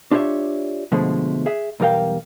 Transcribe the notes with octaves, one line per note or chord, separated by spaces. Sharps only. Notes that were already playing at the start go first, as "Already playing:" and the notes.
D4 F4 G4 B4 C#5 E5
F2 B2 D3 F3 G#3 A3
G#4 E5
B1 E2 G3 A#4 F5 G5